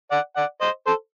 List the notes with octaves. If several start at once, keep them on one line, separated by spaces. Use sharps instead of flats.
D5 F#5
D5 F#5
C5 D#5
A4 C5